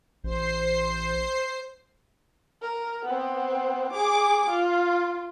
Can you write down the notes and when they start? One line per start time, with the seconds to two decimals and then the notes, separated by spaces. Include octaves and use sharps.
0.24 A1 C5 C7
2.62 A#4
3.05 B3 C4
3.92 G#4 D6
4.50 F4